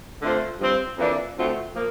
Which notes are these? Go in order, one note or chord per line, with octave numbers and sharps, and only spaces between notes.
D3 A3 C4 F4 C5
G2 F3 C4
F2 E3 A#3 D4
D2 D3 A3 C4 F4
F3 A#3